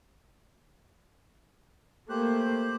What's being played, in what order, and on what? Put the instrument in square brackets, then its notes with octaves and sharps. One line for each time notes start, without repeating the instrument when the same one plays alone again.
[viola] A3 A#3 [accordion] G4 C5 F#6